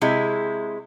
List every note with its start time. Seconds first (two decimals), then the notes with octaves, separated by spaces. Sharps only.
0.01 C3 G#3 E4